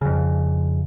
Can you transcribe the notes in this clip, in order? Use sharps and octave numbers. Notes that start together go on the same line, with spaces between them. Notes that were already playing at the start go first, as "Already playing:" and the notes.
F2 C#3